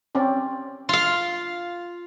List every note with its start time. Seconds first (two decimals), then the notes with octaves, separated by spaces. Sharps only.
0.15 C4 C#4 D5
0.89 F4 F5